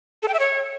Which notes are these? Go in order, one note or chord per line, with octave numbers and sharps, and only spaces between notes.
A4
G5
E5
C#5